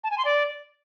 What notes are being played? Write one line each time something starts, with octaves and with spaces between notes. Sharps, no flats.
A5
G#5
C6
D5